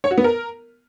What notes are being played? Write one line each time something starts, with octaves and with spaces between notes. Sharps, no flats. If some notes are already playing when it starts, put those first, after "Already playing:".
C#5
F#4
B3
A#4